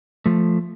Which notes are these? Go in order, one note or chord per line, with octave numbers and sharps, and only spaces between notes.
F3 A3